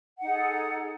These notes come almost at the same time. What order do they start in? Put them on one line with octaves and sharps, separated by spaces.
F#5 D#4 G#4 A4